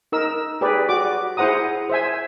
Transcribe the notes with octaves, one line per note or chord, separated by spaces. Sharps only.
D#4 A#4 E6
G4 G#4 B4 D5
F#4 D5 D6
E4 G#4 C5 F#5 A#5 D#6
C5 E5 G#5